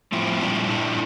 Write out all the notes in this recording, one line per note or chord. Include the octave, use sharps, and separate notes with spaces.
A2 F3 C4 E4
A#2 G3 D4 E4
A#2 G3 D4